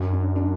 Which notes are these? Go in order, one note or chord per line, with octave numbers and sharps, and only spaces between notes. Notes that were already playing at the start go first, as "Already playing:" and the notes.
Already playing: F#2 D4
D4
D4